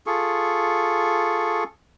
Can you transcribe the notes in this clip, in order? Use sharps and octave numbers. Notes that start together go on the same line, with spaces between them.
F4 G#4 A4 C#6